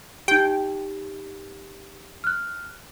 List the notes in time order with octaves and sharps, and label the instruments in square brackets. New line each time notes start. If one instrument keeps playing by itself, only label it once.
[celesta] D#4 G4 [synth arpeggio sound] G5
[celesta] F6 F#6